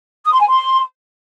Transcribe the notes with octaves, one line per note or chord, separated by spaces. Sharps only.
D#6
C6
G#5
C6